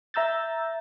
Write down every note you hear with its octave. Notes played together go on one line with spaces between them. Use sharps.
E5 A#5 E6 G6 A6